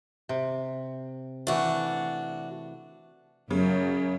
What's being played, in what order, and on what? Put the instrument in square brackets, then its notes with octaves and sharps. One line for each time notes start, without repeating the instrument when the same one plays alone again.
[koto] C3
[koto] E3 A3 [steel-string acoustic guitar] D4 F#4
[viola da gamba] F#2 F#3 [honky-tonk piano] C#3